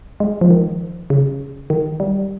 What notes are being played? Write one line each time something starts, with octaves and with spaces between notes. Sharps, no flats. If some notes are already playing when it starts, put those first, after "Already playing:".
G#3
F3
D#3
C#3
D#3
G3